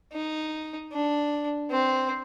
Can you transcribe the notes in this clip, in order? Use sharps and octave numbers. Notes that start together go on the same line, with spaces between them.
D#4
D4
C4